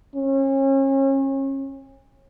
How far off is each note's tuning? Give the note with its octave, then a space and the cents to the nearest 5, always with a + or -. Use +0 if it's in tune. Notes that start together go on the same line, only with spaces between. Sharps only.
C#4 -35